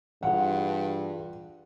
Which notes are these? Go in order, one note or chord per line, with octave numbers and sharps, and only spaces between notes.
G2 E3 F4 G#4 F#5